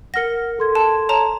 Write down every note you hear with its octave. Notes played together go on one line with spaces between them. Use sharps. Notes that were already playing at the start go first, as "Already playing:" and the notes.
A#4 F#5 F6 A#6 C#7
A4 C6 G#6
A5
C#5 A5 A#5